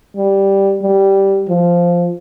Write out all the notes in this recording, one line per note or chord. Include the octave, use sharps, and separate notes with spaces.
G3
G3
F3